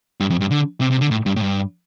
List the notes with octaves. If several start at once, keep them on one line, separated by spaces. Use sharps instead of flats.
G2
F2
G2
D3
C3
C3
D3
A2
G2
A2
G2